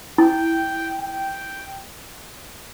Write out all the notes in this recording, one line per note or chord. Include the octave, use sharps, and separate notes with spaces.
E4 G5
G5